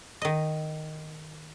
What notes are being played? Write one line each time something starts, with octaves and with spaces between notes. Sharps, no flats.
D#3 D#5